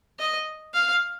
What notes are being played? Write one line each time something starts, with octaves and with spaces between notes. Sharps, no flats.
D#5
F5